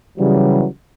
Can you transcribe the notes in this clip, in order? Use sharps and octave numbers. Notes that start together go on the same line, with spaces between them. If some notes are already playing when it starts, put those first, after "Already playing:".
C#3 E3 F#3 G3